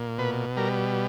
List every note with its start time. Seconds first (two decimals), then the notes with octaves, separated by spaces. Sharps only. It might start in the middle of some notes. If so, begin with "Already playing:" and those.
Already playing: A#2
0.18 B2 B4
0.57 G3 A#4